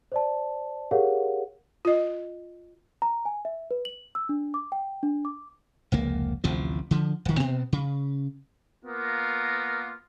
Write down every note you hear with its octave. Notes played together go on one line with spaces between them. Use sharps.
C5 D5 A5
G4 G#4 A#4 C#5 F5 F#5
F4 D#5
A#5
G#5
E5
B4
F#7
E6
D4
D6
G5
D4
D6
F1 C#2 A#3
A1 D2 C3 F3
D3 F3
D#1 D#3
B2 B3 C4
C#3
A#3 B3 F4 A#4